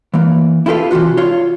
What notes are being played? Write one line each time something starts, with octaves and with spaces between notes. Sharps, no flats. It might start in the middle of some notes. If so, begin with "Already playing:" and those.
E3 A#3
E4 F4 G4 A4 B4 F5
C3 E3 G3 F4 F#4
F4 C#5 F5